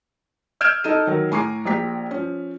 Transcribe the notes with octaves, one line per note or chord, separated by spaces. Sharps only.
E6 F6 G6 G#6 D7 E7
D#4 A4 D#7
D#3 F#3 A#4
A2 G#5 A#5 C#6 D6 C7
A#1 G4 A#5 B6
F3 C#4